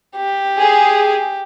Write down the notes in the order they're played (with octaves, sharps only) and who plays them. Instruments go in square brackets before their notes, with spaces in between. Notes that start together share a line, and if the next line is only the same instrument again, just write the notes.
[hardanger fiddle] G4
[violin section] G#4